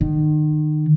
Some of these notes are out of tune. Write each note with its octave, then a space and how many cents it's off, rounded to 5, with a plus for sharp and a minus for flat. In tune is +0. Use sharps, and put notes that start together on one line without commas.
D#3 -35